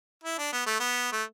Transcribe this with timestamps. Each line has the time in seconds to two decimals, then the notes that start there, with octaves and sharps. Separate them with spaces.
0.24 E4
0.38 D4
0.52 B3
0.66 A3
0.80 B3
1.12 A3